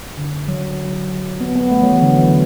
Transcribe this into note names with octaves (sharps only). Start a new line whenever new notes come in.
D3
F#3
B3
B3
A3
F#3
E3
D3
E3